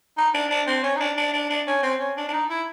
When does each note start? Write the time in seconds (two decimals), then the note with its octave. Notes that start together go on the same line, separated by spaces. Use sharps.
0.17 D#4
0.34 D4
0.50 D4
0.67 C4
0.83 C#4
0.95 D#4
1.00 D4
1.17 D4
1.33 D4
1.50 D4
1.67 C#4
1.83 C4
1.99 C#4
2.17 D4
2.28 D4
2.33 D#4
2.49 E4